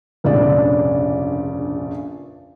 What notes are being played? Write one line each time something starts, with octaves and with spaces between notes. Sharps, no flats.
F1 A#1 G2 C#3 D5